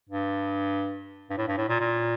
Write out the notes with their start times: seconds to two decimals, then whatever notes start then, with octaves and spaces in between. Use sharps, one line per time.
0.09 G2
1.30 G2
1.37 A2
1.48 G2
1.57 A2
1.69 A#2
1.80 A#2